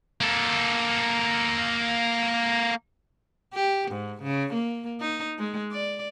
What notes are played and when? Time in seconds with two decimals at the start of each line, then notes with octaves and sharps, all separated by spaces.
0.21 A#3 A4
3.54 G4
3.92 G#2
4.23 C#3
4.54 A#3
5.00 D#4
5.38 G#3
5.72 D5